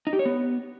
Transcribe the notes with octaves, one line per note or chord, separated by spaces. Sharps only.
D#4
G4
C#5
B3